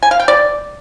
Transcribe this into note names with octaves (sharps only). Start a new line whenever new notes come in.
G#5
F5
G5
D5